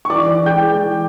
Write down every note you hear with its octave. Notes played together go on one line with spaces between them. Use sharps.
C#6
E3 D5 D6
E3
G#3 G5 G6
G#3
E3